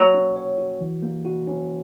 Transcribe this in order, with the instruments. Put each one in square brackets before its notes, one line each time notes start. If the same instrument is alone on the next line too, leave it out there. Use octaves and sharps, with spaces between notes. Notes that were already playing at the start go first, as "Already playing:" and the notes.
Already playing: [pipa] F#3 [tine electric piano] A#3
[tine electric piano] C#4
C#5
F#4
E3
A#3
F#4
C#4